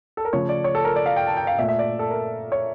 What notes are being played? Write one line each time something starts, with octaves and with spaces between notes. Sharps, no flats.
A4
A#4
C#3 F3 A3 C#5
D5
C#5
A4
A#4
D5
F5
G5
A5
G5
F5
A#2 A3 E5
E5
D5
A4
A#4
C#5